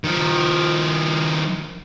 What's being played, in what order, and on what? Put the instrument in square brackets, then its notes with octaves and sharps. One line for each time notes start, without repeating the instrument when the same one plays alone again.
[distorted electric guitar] D#3 F3